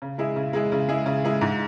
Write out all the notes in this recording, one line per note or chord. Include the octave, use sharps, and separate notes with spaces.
C#3
G#3 E4 G#4
C#3
G#3 E4 G#4
C#3
G#3 E4 G#4
C#3
G#3 E4 G#4
G#2